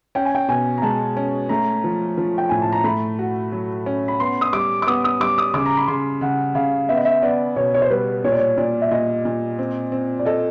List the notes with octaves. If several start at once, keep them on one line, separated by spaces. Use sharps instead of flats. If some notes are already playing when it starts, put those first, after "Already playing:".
C#4 G5
G#5
G5
B2 G#5
A#5
G#3 A5
C#4
A3 A#5
F3
F3
G5
A2 G#5
A5
A#5
A3 B5
F#4
F#3
C#4
B5
B3 C6
D#6
G3 D6
D6
B3 D#6
D#6
G3 D6
D#6
C#3 D6
A#5
B5
C#3 C6
C#3 F#5
C#3 F5
B3 E5
D#5
E5
B3 D5
B2 C#5
C#5
C5
G3 B4
A#2 C#5
D5
C#5
A#2 D5
E5
A#2 D#5
A#2
C4
C4
D5
A4 D#5